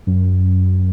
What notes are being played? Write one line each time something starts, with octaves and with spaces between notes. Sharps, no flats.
F#2